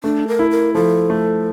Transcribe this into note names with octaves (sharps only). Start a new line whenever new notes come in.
A3 D4
A#4
E4
A#4
F3 A4
A3